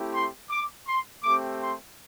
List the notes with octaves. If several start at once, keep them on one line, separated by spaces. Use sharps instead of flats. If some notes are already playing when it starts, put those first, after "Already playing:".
Already playing: A3 C4 E4 G4
C6
D6
C6
A3 C4 G4 D6
C6